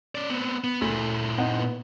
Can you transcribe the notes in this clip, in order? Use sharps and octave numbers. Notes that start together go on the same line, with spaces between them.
C#4 D5
B3 C4
B3
D2 A#2 E4
C4 D#4 F#5
B3